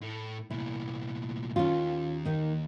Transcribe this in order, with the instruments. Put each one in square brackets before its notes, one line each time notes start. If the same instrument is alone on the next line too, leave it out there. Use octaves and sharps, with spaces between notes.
[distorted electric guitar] A2 E4
[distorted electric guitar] C2 A#2 [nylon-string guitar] E4
[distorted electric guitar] D#2 [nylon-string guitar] C#4 F4
[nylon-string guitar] D#3 D#4